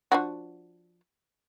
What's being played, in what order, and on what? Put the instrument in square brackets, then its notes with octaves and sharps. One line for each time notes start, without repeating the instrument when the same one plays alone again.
[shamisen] F3 D4 F#4